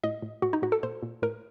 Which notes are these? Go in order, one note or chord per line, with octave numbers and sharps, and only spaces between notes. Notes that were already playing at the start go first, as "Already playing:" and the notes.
A2 D#5
A2
A2 F#4
D#4
A2 F#4
A4
A#2 C5
A#2
A2 A#4